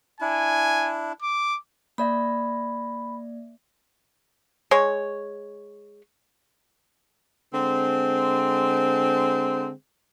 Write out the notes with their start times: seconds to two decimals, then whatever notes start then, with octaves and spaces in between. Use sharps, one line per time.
0.21 D4 E4 G#5
1.22 D6
1.98 A#3 D5 E5 B5
4.71 G#3 C#5
7.54 D3 G#3 C4